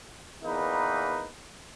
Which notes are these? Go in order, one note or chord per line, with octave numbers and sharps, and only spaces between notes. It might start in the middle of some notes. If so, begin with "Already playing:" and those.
E2 A#3 D#4 B4